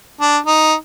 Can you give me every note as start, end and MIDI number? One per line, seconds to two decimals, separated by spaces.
0.21 0.37 62
0.47 0.73 63